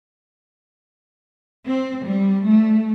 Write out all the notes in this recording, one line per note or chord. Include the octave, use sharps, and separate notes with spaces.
C4
G3
A3